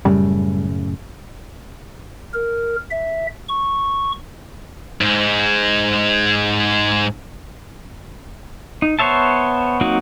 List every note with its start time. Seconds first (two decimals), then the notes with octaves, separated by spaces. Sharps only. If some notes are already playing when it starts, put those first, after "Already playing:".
0.05 F#2 A2 C#3 G3
2.34 A#4
2.91 E5
3.49 C#6
5.01 G#2 G#3
8.82 D#4
8.99 B3 C5 C#5 E5 A5
9.81 F#3 A#3 C4 D#4 F#4